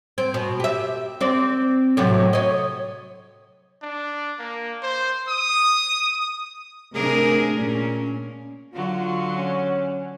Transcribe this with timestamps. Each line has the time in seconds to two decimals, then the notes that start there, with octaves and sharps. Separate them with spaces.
0.18 C4
0.34 B2
0.60 G4 E5
1.21 C4 D5
1.97 A2 C3 F#3
2.33 C#5 D#5
3.83 D4
4.39 A#3
4.83 C5
5.29 D#6
6.95 C3 A3 D4 G#4 A#4
7.56 A#2 C#4
8.74 D3 F#3 F4
9.36 C#4